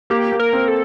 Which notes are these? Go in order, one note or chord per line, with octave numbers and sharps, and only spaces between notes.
A#3 G4
A#3
A#4
C4
A4